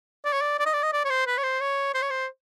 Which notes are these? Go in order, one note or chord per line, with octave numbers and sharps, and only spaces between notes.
D5
C#5
D5
D5
D#5
D5
D#5
D5
C#5
C5
B4
C#5
C5
C#5
C5
C#5
C5